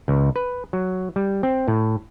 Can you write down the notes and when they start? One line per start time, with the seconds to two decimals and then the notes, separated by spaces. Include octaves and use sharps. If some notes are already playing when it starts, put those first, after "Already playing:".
0.08 C#2
0.36 B4
0.73 F#3
1.16 G3
1.43 C4
1.68 A2